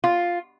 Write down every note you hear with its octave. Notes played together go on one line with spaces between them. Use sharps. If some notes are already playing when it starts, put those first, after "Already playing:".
F4